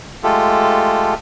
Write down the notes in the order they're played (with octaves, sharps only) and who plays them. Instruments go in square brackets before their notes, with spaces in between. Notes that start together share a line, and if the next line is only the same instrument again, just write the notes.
[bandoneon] G#3 A3 F4 G4 A4